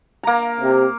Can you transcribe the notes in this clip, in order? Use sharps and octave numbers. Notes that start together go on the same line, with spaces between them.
A#3 A#5
C3